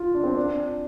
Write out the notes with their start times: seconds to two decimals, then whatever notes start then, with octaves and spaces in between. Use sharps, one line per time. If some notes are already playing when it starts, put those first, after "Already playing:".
Already playing: F4
0.14 D4
0.23 C4
0.32 D4